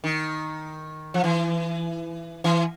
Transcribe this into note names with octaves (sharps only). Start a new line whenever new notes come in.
D#3
F3
E3
E3